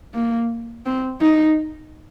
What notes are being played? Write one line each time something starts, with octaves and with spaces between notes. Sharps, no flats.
A#3
C4
D#4